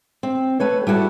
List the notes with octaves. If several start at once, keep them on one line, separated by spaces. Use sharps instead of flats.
C4
A3 B4 C#5
G3 E4 F#4 G#4 A4